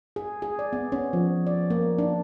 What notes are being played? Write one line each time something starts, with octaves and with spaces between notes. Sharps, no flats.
G#4
G#4
D5
B3
C#4
F3
D5
A#3
D4